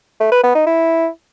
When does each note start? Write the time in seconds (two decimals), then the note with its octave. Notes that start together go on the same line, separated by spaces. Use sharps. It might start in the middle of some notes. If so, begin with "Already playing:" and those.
0.20 A3
0.32 B4
0.43 B3
0.55 D#4
0.66 E4